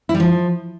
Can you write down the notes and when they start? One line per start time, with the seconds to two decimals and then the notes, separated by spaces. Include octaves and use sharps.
0.09 E4
0.14 G3
0.20 F3